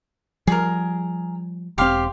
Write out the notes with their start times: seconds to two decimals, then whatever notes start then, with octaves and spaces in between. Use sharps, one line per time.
0.47 F3 G3 G#4 A#4
1.78 E1 C4 G4 F5 C6